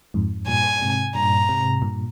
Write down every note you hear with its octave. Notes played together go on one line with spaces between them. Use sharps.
F2 G#2
G2 A#2 G#5
G#2 C3
G2 A#2 A#5
G#2 C3
G2 A#2